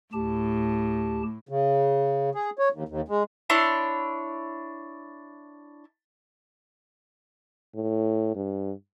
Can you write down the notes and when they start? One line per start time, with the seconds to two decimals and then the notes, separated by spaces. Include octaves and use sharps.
0.13 D2 A2 G4 A5
1.49 C#3
2.35 G#4
2.59 C#5
2.72 D#2
2.89 D#2
3.08 G#3
3.50 D4 E4 C#5 C6
7.75 A2
8.35 G2